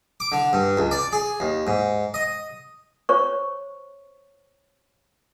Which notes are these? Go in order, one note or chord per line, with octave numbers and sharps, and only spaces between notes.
D6
D3
G2
C#2
D5
G#4
D#2
G#2
D#5
C5 C#5 C#6